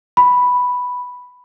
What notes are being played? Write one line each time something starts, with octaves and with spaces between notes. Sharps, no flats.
B5